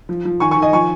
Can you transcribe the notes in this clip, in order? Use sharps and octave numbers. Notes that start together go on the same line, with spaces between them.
F3
F3
D#3 G#5 C#6
G#5 C#6
D#3
D#5 G#5
F3 G#5 C#6